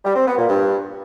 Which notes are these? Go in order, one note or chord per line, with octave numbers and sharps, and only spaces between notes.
G3
C4
B3
A#2
G2